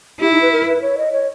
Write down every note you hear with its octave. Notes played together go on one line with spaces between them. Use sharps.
E4 G4
D#4
B4
A#4
B4
C#5
D#5
C#5